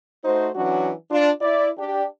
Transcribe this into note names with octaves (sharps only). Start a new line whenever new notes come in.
A3 D#4 F#4 C5
E3 F#3 C#4 D4 F#4
D4 F4
E4 D5
D4 G4